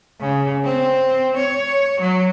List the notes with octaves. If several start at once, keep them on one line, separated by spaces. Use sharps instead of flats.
C#3
C4
C#5
F#3